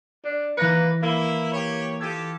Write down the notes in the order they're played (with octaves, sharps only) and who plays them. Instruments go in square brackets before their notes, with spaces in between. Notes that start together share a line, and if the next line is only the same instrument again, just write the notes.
[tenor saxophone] D4
[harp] E3 A#6 C#7 [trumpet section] A#3 [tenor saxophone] B4
[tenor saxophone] A#3 [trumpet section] E4
[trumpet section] G4 C#5
[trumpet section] F4 G4 A4 [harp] D#6 G#6